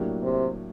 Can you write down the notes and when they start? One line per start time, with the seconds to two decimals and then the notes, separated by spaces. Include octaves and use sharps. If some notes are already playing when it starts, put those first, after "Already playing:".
Already playing: A2 F#3 A#3 D4 G4
0.23 C3